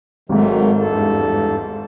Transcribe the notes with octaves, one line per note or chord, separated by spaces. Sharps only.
G#1 G#2 D#3 F#3 A3
E2 G2 A4